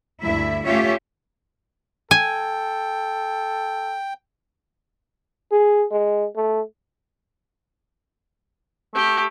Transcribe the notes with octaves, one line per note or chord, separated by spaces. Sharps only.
D2 G2 E4 E5
A3 C#4 F4 G4 C#5 E5
A4 G5 G#5
G#4
G#3
A3
A3 G4